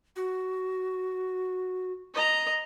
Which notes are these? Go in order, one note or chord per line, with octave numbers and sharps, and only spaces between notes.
F#4
D#5 A#5